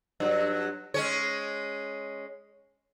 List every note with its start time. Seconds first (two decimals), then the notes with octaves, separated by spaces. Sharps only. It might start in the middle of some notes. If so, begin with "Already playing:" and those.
0.20 G2 F#3
0.94 G#3 C#4 C#5